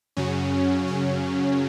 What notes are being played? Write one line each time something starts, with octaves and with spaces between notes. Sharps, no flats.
F#2 C#3 F#3 C#4
C#4